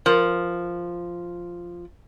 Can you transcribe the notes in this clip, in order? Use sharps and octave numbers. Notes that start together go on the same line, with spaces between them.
F3 A#4